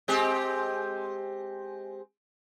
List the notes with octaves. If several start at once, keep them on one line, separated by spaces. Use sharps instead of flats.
G#3 C4 G4